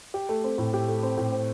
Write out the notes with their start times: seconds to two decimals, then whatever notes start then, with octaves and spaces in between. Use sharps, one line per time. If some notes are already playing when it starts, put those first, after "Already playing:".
0.14 G4
0.29 A3
0.44 C4
0.58 A2
0.74 G4
0.88 A3
1.03 C4
1.18 A2
1.32 C4